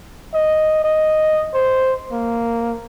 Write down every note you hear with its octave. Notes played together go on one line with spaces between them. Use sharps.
D#5
D#5
C5
A#3